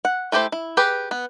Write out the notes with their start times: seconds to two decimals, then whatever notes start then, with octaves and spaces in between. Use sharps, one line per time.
0.05 F#5
0.32 A3 E4 G4 A4 C5
0.52 E4
0.77 G4 G#4 B4
1.11 B3